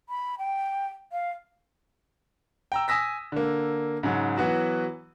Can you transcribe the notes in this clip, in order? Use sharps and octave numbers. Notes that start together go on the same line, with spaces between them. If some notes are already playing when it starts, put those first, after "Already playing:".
B5
G5
F5
G5 A#5 E6
G#5 D#6 E6 A#6 B6
D3 A#3
G#2 C#3 F#3
E3 F#3 B3 F#4